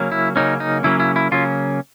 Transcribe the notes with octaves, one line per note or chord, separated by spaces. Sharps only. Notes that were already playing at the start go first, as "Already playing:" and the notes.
Already playing: C#3 F#3 A#3 C#4
E4
C#3 F#3 A#3 C#4 D#4
D#4
C#3 F#3 A#3 C#4 E4
E4
E4
C#3 F#3 A#3 C#4 F4